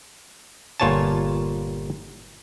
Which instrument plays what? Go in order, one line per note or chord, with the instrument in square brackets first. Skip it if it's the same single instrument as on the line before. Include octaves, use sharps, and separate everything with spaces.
[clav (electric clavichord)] G1 A#2 F4 C#5 G#5 A5